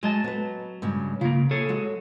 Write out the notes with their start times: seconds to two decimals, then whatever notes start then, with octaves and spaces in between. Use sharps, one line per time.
0.03 F#3 G#3 D#5 A5
0.24 B3 B4
0.82 G2 C#3 G#3
1.21 C#3 A#3 F4
1.51 G#4 A4 C#5
1.69 F#3 G#3 F#4